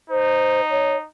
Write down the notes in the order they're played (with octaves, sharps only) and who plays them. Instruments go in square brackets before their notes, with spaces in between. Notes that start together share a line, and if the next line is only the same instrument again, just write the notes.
[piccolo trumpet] D#4 [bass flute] C5
[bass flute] C#5